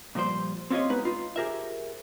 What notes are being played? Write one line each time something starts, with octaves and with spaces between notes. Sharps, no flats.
A#2 F3 G3 C5
C4 C#4 F4 G4 C#5 D#5
G#3 B3 D#4 B4
D#4 F4
G4 G#4 A#4 C5 E5